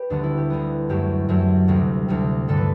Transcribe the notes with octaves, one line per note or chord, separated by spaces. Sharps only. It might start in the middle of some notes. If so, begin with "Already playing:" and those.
Already playing: G4 B4
D2 D3 G3 B3 D4
E4
G4
D2 D3 G3 B3
F#2 F#3 A3 G4
F#2 F#3 A3
D2 C3 G3
D2 C3 G3
G2 D3 G3 A4
B4